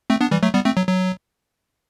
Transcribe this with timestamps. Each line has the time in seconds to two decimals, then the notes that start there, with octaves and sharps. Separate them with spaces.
0.10 A3 C4
0.21 B3 D4
0.31 E3 G3
0.43 F#3 A3
0.54 G3 B3
0.65 A3 C4
0.77 F#3
0.88 F#3